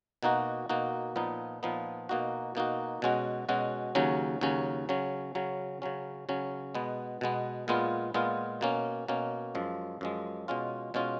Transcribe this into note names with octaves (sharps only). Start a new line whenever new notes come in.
B2 A#3 D#4 F#4
B2 A#3 D#4 F#4
A#2 F3 B3 D#4
A#2 F3 B3 D#4
B2 A#3 D#4 F#4
B2 A#3 D#4 F#4
B2 G#3 C#4 F#4
B2 G#3 C#4 F#4
D#2 C#3 F#3 C#4
D#2 C#3 F#3 C#4
C#3 F#3 C#4
C#3 F#3 C#4
C#3 F#3 C#4
C#3 F#3 C#4
B2 G#3 B3
B2 G#3 B3
A#2 G#3 B3 F4
A#2 G#3 B3 F4
B2 A#3 C#4
B2 A#3 C#4
F#2 F3 G#3
F#2 F3 G#3
B2 G#3 C#4 F4
B2 G#3 C#4 F4